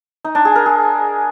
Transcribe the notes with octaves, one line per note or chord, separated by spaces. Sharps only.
D#4
D4
G#4
A#4
G#4